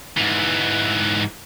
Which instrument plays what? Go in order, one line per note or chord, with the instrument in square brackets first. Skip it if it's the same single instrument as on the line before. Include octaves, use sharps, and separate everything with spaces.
[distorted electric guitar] G#2 E3